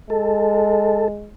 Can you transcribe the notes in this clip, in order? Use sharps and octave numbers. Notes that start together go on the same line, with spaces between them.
G#3 A4